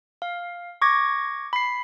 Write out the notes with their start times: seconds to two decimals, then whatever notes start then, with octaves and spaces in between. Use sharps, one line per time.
0.22 F5
0.82 C#6 D6 G#6 A#6
1.53 B5 C7